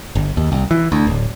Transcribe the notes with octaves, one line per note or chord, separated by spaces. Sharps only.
G1
D#2
C2
E3
D2
D1